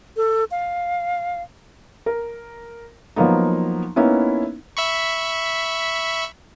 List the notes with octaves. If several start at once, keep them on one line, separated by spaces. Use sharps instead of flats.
A4
F5
A#4
F3 F#3 A#3 B3 D#4
A#3 B3 C#4 D#4 E4
E5 B5 C#6